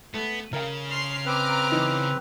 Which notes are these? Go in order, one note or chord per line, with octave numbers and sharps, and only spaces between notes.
A3 B3
C#3 A#4 F5
C6 F6 C7
C4 B4 A#5 D6 F6
E3 D#4